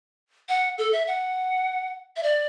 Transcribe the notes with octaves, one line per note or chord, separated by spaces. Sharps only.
F#5
A4
E5
F#5
E5
D5